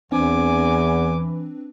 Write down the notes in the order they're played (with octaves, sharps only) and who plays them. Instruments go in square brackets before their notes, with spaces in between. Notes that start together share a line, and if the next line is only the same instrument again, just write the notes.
[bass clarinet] E2 [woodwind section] E3 [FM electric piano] C4 D4 B4 [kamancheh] G#5 D6